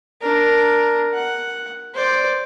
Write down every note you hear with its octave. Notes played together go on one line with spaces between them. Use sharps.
D4 A#4
F#5
C5 D5